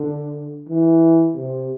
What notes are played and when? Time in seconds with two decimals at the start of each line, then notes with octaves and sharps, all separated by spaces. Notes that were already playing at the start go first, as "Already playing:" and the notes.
Already playing: D3
0.68 E3
1.36 C3